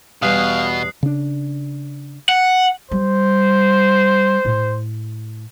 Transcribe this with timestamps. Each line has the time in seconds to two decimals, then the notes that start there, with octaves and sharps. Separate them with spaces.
0.22 E2 B2 G3 F5 G#5 D#6 F#6 C7
1.03 C#3 D4
2.29 F#5
2.91 G3 C5
4.45 A2